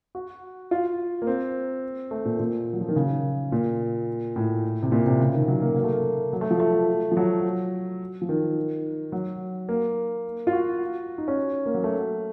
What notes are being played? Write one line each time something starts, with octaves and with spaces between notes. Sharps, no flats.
F#4
F4
A#3
C4
A3
A#2
A#2
F#3
F3
D#3
C#3
A#2
A2
C3
A#2
C3
C#3
D#3
F#3
A#3
A#3
A3
A#3
F#3
A3
F3
A3
F3
F#3
F3
D#3
F#3
A#3
F4
F#4
D#4
C#4
A#3
F#3
A3